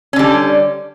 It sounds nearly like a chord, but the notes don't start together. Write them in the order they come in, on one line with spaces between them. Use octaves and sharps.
C#4 D3 G3